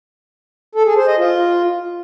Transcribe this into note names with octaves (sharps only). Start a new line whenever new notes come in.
A4
G#4
C5
D#5
F4